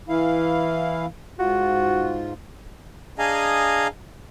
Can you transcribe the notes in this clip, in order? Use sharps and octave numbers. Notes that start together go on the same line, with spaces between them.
E3 E4 F5
G#2 F4 F#4
D4 G#4 D#5 F5 G#5 A#5